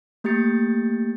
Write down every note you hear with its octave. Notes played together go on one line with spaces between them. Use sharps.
A3 A#3 G4 G6 A6 C#7